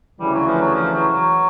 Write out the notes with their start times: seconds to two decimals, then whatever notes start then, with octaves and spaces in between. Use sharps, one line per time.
0.20 D2 C#3 E3 G3
0.34 F#3
0.47 F3
0.61 F#3
0.75 F3
0.93 F#3
1.11 F#3